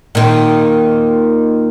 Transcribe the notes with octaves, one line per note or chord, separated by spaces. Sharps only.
A#2 D#3